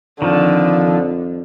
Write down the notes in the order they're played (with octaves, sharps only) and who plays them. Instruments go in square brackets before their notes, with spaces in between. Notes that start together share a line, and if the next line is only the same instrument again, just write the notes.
[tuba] F2 [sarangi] D3 [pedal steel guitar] D#3 F3